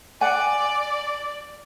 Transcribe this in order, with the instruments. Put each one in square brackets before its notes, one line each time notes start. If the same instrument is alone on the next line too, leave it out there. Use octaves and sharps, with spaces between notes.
[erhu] D5 [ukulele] F#5 G#5